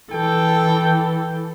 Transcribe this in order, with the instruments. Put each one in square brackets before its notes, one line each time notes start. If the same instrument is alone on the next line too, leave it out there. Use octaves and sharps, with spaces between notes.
[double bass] E3 [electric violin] A4 [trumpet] G5